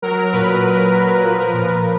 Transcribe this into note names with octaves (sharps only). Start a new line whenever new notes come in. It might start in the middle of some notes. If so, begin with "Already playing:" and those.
F#3 A#4
A#2 B4
A#2
F#3
F3 B4
A#4
A#2 B4
A#4